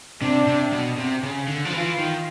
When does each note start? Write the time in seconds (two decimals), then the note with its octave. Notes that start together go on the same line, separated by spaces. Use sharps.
0.21 C3 D4
0.47 C3
0.73 B2
0.98 C3
1.23 C#3
1.48 D3
1.65 F3
1.73 E3 F4
1.99 D#3